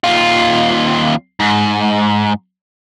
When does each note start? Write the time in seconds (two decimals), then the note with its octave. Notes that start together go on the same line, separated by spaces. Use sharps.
0.04 D#2 F4
1.40 G#2